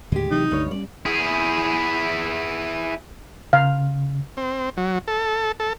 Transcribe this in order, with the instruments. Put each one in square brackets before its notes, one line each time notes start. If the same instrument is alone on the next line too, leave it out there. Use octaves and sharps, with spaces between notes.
[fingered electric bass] D#2 A2 D3 [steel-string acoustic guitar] G#3 G4
[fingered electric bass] C3 E3 F#3 [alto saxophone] D#4
[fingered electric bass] C#2 D3 A3 [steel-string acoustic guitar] G2 C#5
[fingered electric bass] G3 B3 C#4 [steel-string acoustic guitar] D5
[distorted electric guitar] E4 G#4
[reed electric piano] C#3 [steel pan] F5
[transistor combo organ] C4
F#3
A4
A4